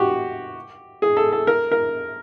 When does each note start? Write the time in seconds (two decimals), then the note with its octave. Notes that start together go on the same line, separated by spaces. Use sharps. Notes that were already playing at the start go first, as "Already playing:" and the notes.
Already playing: F#4 G4
1.02 G#4
1.17 A4
1.32 A4
1.47 A#4
1.72 A#4